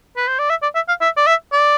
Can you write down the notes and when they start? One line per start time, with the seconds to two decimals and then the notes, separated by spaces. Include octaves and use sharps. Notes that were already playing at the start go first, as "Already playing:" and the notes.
0.17 B4
0.28 C5
0.39 D5
0.50 E5
0.63 D5
0.75 E5
0.88 F5
1.01 E5
1.17 D5
1.27 E5
1.52 D5